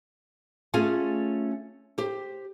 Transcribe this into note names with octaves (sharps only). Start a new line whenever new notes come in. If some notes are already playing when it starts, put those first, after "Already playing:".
A3 C#4 F4 G#4 G#5
G4 C5